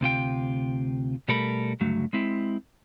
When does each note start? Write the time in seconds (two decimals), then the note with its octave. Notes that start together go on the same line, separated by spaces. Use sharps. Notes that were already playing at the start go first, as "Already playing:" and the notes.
0.01 D2 C3 F4 G5
1.28 B2 G3 A3 A4 A#4 B5
1.80 C#2 G2 D3 F#3 A3
2.13 G#3 C4 E4